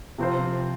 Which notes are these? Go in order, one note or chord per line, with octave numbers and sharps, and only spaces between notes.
C3 F3 C4 F4 C5